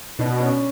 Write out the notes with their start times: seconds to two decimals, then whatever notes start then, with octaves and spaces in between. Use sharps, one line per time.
0.19 B2 D4
0.40 C#4